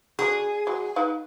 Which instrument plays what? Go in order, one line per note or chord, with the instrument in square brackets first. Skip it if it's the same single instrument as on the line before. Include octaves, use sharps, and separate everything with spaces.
[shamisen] D4 E4 F#4 [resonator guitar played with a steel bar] G#4
[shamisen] F#3 G#3
D#4 B4 F5